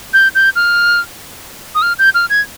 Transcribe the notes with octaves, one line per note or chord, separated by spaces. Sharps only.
G6
G6
F6
D#6
F6
G6
F6
G#6